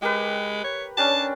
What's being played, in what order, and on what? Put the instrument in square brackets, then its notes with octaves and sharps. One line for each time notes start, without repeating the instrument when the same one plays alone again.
[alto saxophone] G#3 [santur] G4 A#4 B4
[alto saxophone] C#5
[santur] C#4 D4 G4 [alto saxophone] A5